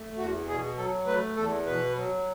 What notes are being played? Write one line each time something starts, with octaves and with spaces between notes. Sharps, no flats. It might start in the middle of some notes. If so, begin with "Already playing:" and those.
Already playing: A3
E2 F#4
B2 G#4
F#3 A4
A3 B4
E2 A4
B2 B4
F#3